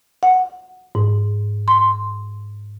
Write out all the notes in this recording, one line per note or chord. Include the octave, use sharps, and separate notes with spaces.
F#5
G#2
C6